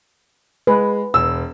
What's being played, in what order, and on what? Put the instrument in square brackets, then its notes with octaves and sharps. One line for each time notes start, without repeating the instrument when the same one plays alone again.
[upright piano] G#3 [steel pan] B4
[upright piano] E1 E6